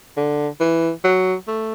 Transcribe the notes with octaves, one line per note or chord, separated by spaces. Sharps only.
D3
E3
F#3
A3